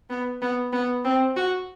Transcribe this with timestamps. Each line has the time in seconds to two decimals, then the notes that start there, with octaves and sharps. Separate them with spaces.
0.10 B3
0.42 B3
0.72 B3
1.04 C4
1.36 F#4